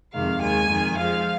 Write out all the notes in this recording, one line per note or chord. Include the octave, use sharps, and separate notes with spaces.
F2 C3 D#3 G#3 F5
D#2 D#3 G#3 G#5
F2 D#3 G#3
F2 F3 G#3 F5